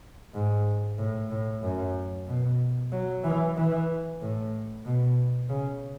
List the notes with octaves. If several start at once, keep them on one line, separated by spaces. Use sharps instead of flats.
G#2
A2
A2
F#2
B2
F#3
E3
E3
A2
B2
C#3